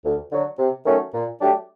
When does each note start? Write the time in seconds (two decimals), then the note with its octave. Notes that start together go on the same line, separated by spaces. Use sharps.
0.04 D2
0.31 D3 F#3
0.58 C3
0.86 D#3 F#3 A3 C#4
1.13 A#2
1.40 F#3 A3 D4 G4